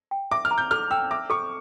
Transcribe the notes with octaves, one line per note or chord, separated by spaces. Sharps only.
G5
E5 D6
F6
A#5
G6
A4 F6
G5 E6
E5 D6
A4 C#6